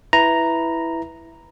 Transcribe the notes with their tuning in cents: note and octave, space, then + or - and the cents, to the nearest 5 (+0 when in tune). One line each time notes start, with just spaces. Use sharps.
E4 +0 B4 +0 A#5 +0